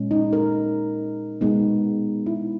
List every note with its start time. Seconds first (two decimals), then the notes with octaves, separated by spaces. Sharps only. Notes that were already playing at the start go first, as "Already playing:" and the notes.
Already playing: A#2 G#3 C#4
0.11 D#4
0.33 A#4
1.41 B2 G#3 B3 D#4
2.26 E4